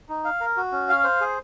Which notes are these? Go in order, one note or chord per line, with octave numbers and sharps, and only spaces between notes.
D#4
F5
A#4
F#4
C#4
F5
C5
G#4